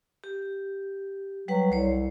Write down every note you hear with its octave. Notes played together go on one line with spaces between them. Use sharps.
G4
F#3 G3 B4 F#5
C2 C5 C#5